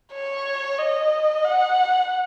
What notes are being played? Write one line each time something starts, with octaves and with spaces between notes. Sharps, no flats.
C#5
D#5
F#5